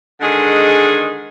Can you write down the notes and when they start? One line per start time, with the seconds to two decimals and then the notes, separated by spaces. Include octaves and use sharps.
0.21 D3 D#3 G#3 G#4